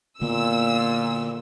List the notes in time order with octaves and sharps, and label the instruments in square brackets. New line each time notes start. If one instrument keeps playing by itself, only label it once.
[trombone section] A#2 [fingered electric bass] D3 A#3 B3 [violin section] E6